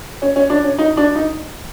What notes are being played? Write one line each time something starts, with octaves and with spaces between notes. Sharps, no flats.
C#4
C#4
D4
C#4
D#4
D4
D#4